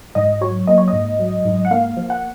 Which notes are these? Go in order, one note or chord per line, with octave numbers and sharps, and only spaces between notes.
G#2 D#5
F#3 C#5
A#3 D#5
C#5
D#5
G#2
F#3
G#2
F#5
A#3 F5
F3
F#5